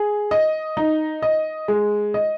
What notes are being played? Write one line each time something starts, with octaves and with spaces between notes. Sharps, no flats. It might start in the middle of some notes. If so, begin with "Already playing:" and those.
Already playing: G#4
D#5
D#4
D#5
G#3
D#5